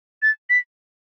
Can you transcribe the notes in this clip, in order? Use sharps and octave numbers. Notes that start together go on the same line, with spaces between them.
A6
B6